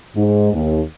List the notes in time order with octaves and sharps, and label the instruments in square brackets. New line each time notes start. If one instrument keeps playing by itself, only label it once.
[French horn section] G#2
D#2